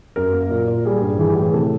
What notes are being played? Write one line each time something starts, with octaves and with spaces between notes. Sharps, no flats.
F#2 A#4
A#3
A#2
A#2
G3 G#4
G2 G#4
E3 G#4
G4
A2
G#4
C3 A4